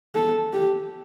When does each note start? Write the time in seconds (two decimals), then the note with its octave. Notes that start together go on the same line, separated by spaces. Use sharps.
0.15 A4
0.53 G4